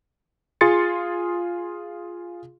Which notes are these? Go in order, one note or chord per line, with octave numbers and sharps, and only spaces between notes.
F4 G#4 C6 A6 C#7